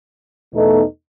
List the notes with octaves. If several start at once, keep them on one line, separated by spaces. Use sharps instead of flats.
E2 B2 A3 D#4 A4